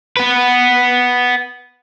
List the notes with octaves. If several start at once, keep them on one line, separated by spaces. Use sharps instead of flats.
B3 B4